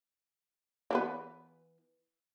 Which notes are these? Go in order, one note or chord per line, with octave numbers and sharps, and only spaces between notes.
E3 B3 B4